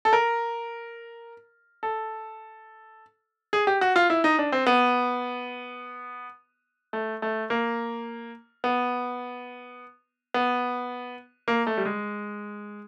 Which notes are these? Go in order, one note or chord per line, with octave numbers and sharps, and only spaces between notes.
A4
A#4
A4
G#4
G4
F#4
F4
E4
D#4
D4
C4
B3
A3
A3
A#3
B3
B3
A#3
A3
G3
G#3